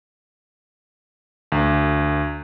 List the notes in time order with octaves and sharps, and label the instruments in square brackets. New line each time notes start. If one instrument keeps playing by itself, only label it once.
[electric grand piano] D2